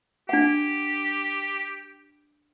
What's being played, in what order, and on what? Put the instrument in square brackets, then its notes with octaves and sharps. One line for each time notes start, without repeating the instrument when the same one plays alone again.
[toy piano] D4 F#5 [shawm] G4